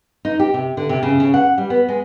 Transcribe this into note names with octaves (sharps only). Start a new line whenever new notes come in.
D#4
G4
C3
D3
C3
C#3
C#3
F#5
G3
B3
G#3